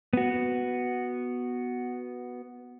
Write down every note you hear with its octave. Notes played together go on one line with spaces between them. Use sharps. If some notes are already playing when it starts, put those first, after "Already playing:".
B3 F#4